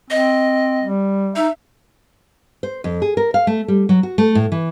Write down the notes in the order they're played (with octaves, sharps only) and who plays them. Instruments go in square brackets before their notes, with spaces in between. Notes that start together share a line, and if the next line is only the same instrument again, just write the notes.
[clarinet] C4 [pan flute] D#5
[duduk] G3
[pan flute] D#4 [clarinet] E5
[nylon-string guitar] C5
F2
G#4
A#4
F5
A3
G3
F#3
F#4
A3
A2
E3